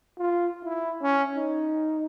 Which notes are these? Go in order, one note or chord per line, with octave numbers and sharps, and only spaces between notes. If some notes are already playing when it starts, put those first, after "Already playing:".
F4
E4
C#4
D#4